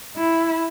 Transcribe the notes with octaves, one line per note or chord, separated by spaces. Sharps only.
E4